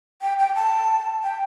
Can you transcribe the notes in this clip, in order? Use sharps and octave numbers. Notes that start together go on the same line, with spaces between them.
G5
G5
A5
G5